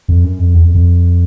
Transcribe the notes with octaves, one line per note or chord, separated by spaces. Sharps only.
F2
F#2
F2
E2
F2
F2